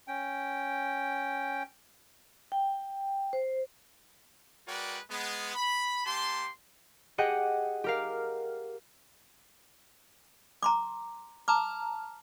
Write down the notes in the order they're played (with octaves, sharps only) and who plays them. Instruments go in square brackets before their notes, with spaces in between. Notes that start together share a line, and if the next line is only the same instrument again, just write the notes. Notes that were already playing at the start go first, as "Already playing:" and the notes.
[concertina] C#4 G5
[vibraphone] G5
C5
[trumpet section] G#3 F#4 A#4 B4 D5 G5
G#3 B3
B5
A#3 G4 A5 C6
[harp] G4 G#4 D#5 F#5 G5
G4 A#4 F5
[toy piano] A#5 C6 D6
[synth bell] A5 A#5 F6 [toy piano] D6